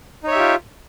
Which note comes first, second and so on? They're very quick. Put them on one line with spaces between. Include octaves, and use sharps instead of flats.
D#4 C#5 E5 G4 F4